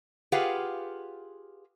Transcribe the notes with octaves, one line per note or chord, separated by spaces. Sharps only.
F4 G4 G#4 B4 F5 F#5